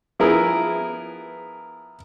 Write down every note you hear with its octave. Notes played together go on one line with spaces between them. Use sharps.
F3 B3 E4 G#4 A#4